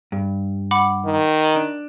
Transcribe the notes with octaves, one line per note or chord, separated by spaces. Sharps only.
G2
F#5 B5 D6
D#3
D4